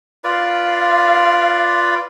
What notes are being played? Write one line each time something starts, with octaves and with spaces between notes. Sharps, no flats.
F4 B4 D5 F5